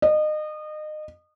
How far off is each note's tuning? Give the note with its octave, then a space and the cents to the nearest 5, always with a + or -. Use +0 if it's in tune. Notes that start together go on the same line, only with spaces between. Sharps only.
D#5 -30